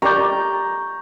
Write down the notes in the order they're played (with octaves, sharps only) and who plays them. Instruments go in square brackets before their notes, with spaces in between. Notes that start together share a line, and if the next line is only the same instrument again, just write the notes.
[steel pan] G4 A#4 D5 [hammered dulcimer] A#5 [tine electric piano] C#6 G6